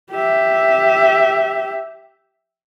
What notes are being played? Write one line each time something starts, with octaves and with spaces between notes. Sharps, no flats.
G4 E5